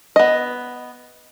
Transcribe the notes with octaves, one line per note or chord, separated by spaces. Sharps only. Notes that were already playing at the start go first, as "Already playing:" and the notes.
B3 D#5